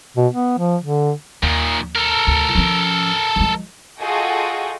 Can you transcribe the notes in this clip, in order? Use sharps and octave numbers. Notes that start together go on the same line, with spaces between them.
B2
B3
F3
D3
D#2 A#2 D#3
A4 A#4
D2
F3 C#4
F3 G#3
F4 F#4 G#4 A4 D#5 G5